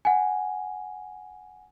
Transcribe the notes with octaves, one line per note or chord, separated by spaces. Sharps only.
F#5 G#5